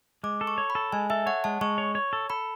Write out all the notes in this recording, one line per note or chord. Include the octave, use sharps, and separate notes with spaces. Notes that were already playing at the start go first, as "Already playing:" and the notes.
G#3 D6
A4
C#6
C#5
B5
A4
G#3 G#5
A4 E5
C#5 F#5
G#3 A5
G#3 C#6
C#5
C#5
A4
A4 B5